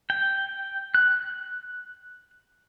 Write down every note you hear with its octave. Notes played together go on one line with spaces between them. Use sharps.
G5
F#6